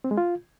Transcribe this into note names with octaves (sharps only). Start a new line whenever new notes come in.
C4
G#3
F4